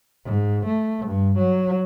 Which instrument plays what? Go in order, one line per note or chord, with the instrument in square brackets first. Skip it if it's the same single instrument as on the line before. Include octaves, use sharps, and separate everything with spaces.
[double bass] G#2
A3
G2
F#3